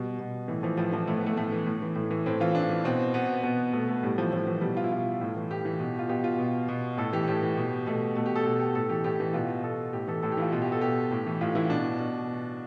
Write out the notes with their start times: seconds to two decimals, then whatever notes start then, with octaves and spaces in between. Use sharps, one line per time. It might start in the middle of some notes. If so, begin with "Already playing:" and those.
Already playing: B2 G3
0.19 B2
0.48 A2 E3
0.63 E3 F3
0.77 A2 F3
0.92 E3 F3
1.07 A2 A3
1.17 B3
1.23 E3 A3
1.37 A2 A3
1.52 E3
1.66 A2
1.82 E3
1.96 A2
2.11 E3
2.26 A2 C4
2.40 E3 F4
2.55 A2 D4
2.70 E3
2.84 B2 C4
3.14 B2 B3
3.44 B2 B3
3.73 B2 A3
3.88 A3
4.03 A2 G3
4.17 E3 F3
4.32 A2 F3
4.47 E3
4.61 B2 G3
4.77 F4
4.84 E4
4.92 B2 F4
5.21 A2
5.36 E3
5.50 A2 G4
5.65 E3
5.80 B2
5.99 F4
6.09 B2 G4
6.24 F4
6.39 B2
6.68 B2
6.97 A2 A4
7.13 E3 G4
7.27 A2 G4
7.42 E3
7.57 B2
7.86 B2 A3
8.16 B2 A3
8.26 G4
8.36 A4
8.45 B2 G4
8.60 G4
8.75 A2 A4
8.89 E3 G4
9.04 A2 G4
9.20 E3
9.33 B2 F4
9.64 B2 A4
9.93 A2 G4
10.07 E3 A4
10.23 A2 A4
10.32 G4
10.37 E3 E4
10.42 F4
10.52 B2 F4
10.62 G4
10.72 A4
10.81 B2 G4
11.11 A2
11.26 E3
11.41 A2 F4
11.55 E3 E4
11.70 B2 D4
11.99 B2